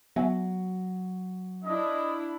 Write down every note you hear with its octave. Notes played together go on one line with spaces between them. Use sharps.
F#3 B3 E5 G#5
D4 E4 D#5